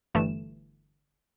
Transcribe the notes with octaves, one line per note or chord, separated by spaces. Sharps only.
G1 E3 A3 E7